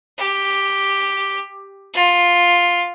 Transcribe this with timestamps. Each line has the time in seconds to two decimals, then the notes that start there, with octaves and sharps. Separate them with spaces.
0.18 G4
1.94 F4